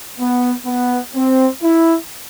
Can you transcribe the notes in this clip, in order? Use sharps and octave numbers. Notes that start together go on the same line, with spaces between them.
B3
B3
C4
E4